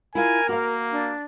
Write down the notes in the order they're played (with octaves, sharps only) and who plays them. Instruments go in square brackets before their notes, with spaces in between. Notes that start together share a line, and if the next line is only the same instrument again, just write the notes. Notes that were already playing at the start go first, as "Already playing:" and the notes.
[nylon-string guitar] E4 F4 F5 [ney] A#4 [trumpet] G#5
[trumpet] A#3 [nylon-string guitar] F#4 F5
[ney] D4